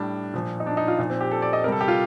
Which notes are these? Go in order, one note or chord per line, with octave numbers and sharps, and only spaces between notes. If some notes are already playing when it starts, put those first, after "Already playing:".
Already playing: A2 G3 D4
A#2 F3
D#4
D4
D#4
F4
A#2 F3 D#4
C4
G4
A4
D5
D#5
C3 G3 A4 A#4
G4
F4